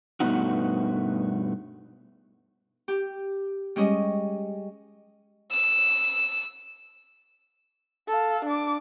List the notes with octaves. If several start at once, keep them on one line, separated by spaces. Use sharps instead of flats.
G2 B2 A3 B3 D#4 F#4
G4
G3 G#3 C#4 D#5
E6
A4 F5
D4 D6